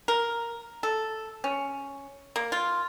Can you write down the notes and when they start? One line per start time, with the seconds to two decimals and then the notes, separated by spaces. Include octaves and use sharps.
0.08 A#4
0.83 A4
1.44 C#4
2.36 A#3
2.52 F4